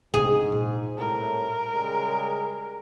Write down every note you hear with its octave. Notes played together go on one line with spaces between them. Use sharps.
G#2 C3 D4 G#4
A#2
C2 A2 A#4
C#3 G3 G#3